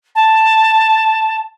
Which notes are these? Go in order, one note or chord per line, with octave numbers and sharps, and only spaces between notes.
A5